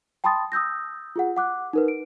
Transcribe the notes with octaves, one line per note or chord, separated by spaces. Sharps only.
G5 A5 B5 C6 D#6 A6
D#6 E6 G6 A#6
F4 G#4 F#5
F#5 D6 F#6
D#4 A#4 B4
D7